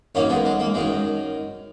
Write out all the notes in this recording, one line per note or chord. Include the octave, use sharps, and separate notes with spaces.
F#2 D#3 A#3 C#4
G#3 B3
G#3
A#3
F#2 D#3 G#3